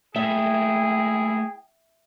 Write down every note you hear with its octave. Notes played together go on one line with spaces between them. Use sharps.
A3 A#3 E4 G#4 E5 G5